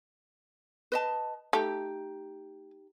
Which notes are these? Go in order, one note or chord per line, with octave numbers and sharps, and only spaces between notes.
B4 D#5 A5
A3 D#4 G4